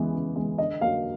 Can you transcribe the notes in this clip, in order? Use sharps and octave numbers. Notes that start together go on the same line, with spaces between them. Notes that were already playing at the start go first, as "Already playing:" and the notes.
Already playing: C#3 E3 G#3 B3
C#3
E3 G#3 B3
D3 D#5
F#3 A#3 F5